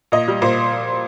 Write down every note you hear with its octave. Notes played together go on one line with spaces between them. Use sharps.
A#2 D#5
G3
A#2 C5